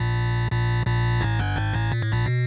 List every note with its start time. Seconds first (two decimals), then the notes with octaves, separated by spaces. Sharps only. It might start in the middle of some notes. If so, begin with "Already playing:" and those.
Already playing: A#1 A#2
0.52 A#1 A#2
0.87 A#1 A#2
1.21 A1 A2
1.39 G1 G2
1.56 G#1 G#2
1.73 A1 A2
1.92 A#2
2.02 A2
2.12 A#1 A#2
2.26 B2